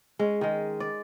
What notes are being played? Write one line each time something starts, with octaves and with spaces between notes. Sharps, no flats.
G#3 C#4
D#3 G#3
D5